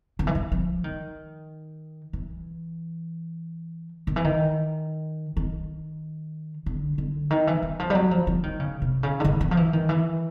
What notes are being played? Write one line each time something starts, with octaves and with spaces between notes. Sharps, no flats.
D#3
E3
D#3
F3
D#3
E3
D#3
E3
D#3
D#3
D3
D3
D#3
E3
E3
F3
G3
F#3
F3
F3
D#3
C#3
C3
C#3
D3
D#3
E3
F3
E3
D#3
E3